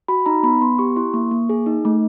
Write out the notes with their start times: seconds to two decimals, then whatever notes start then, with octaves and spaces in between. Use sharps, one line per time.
0.08 F#4 B5
0.26 D#4 A#5
0.43 B3 B5
0.61 B3 C6
0.79 G4 C#6
0.96 E4 C6
1.14 A#3 C#6
1.31 A#3
1.49 G#4
1.66 D#4
1.85 A3